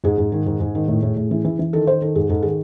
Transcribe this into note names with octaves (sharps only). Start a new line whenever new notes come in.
G#2 G#4
G#2
D#3
G#2
G#2
D#3
A2
A2
A2
E3
E3
E3
D#3 A4
D#3 C5
D#3 A4
G#2 G#4
G#2 A4
D#3 G#4